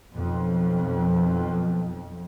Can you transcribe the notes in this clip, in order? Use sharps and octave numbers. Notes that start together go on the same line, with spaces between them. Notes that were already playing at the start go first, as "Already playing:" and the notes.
B1 F2